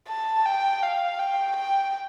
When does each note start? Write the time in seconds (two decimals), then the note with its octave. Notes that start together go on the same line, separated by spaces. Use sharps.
0.08 A5
0.45 G5
0.82 F5
1.19 G5
1.56 G5